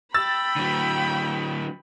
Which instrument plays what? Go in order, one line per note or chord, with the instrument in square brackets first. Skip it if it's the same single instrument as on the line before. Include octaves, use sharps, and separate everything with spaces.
[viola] G5 B5 [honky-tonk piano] E6 A6
[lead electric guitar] D3 F#3